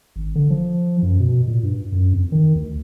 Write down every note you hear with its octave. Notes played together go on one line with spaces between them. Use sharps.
G#1
D3
F3
F#2
B2
A#2
G2
F#2
F2
D#3
D2